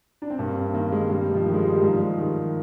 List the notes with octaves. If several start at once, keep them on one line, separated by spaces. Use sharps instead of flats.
D4
C4
G2 A#3
C4
D#3 A#3
G#3
G2 G3
F3
D#3
G#3
G3
G#3
G3
G#2 F3
D#3